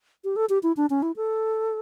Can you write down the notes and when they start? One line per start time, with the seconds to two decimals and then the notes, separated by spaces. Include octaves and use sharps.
0.24 G4
0.36 A4
0.49 G4
0.63 E4
0.77 D4
0.90 C#4
1.02 E4
1.16 A4